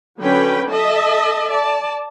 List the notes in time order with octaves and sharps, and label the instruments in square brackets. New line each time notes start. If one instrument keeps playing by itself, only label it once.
[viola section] D3 F#3 C#4 B4 G5 B5
A4 D#5 E5 A5
D5 A5